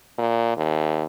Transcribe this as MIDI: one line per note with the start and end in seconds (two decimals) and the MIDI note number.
0.18 0.56 46
0.57 1.04 39